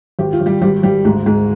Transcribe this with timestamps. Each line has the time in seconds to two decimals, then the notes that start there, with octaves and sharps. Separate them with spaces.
0.19 G#1 G4
0.33 F4
0.41 G#1
0.46 G3 G4
0.61 G#1 G3 G4
0.83 G#1 G3 G4
1.04 D2 G#2 G#3
1.26 D2 G#2 G#3